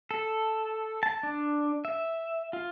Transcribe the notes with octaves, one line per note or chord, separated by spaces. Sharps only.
A4
A5
D4
E5
F4